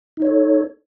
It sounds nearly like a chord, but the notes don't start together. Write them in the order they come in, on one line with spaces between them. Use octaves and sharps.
D#4 C#5 A4